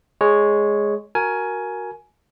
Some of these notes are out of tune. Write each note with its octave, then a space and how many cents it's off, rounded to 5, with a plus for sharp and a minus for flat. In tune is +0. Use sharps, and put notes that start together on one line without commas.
G#3 +0 C#5 +0
F#4 +0 A#4 +0 G#5 +15